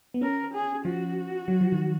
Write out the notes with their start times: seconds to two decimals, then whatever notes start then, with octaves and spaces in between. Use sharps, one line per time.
0.14 B3
0.21 C#4 A#4
0.54 G#4
0.85 F3 F#4
1.48 F#3
1.61 F3
1.72 D#3